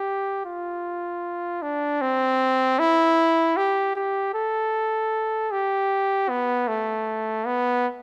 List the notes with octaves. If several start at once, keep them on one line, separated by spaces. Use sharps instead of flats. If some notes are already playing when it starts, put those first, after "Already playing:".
Already playing: G4
F4
D4
C4
E4
G4
G4
A4
G4
B3
A3
B3